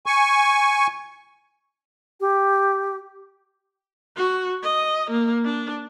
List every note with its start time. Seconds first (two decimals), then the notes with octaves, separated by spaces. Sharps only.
0.06 G#5 C#6
2.20 G4
4.16 F#4
4.63 D#5
5.11 A#3
5.45 D4